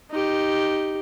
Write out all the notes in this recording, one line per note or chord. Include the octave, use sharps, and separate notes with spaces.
D#4 G4